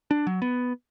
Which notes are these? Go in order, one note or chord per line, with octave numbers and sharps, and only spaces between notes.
D4
F#3
B3